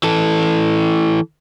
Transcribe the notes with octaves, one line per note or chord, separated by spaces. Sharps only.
E3 A4